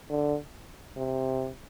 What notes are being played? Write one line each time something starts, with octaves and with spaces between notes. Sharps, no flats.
D3
C3